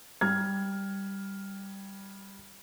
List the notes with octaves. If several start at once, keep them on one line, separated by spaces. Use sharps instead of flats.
G3 F6 G#6